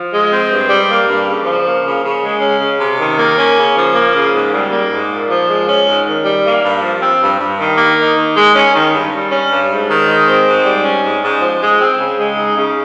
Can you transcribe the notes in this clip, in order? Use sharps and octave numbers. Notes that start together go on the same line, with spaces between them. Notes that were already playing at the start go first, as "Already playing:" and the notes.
Already playing: F3
G#3
C4
G2
G3
A#3
G2
C#3
F3
A#3
C#3
C#3
G#3
C#4
C#3
C3
D#3
A#3
C#4
C#3
F3
A#3
C#3
G#2
G3
A#3
G#2
A#2
F3
G#3
C#4
G#2
D#3
G3
A#3
G2
F3
C4
G2
G2
D#3
A#3
D#4
D#3
G#3
C#4
D#3
G2
G3
C#4
G2
G#2
D#3
G#3
C4
G#2
G3
C#4
G#2
G#2
F3
G#3
C4
C#3
G#3
D#4
C#3